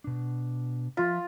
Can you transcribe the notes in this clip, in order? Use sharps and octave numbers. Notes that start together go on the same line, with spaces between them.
B2 D4
F3 F4 E5